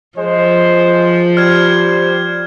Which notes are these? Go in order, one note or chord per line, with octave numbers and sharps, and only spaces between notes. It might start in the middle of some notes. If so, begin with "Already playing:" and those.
F3 G#3 C5
G3 C5 F6 G#6